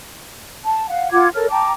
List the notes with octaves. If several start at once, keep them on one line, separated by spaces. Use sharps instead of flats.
A5
F5 F#5
F4 F#5 D6 G#6
A4 A#4 C#5 F6
G5 A5 A#5 D6